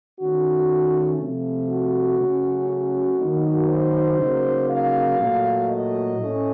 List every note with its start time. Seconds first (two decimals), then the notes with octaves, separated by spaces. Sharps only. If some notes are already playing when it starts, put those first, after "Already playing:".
0.19 D#3 A3 C#4 F#4
1.20 C3 F3 A3
1.69 F#4
2.19 C#3 F#3 A3 C#4
2.69 F#4
3.19 D#3 F#3 A#3 D#4
3.69 C5
4.19 C#3 F#3 A#3 D#4
4.69 F5
5.19 A#2 F#3 A3
5.68 D#5
6.18 A2 A3 C#4